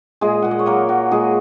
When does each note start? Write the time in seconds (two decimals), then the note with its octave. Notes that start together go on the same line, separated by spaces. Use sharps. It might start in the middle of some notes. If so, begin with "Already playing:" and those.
0.21 A#2 G#3 G#4
0.42 A#2 F#5
0.51 D#5
0.59 C#5
0.66 F#3 A#3 A#4
0.89 F#3
1.11 A#2 G#3 G#4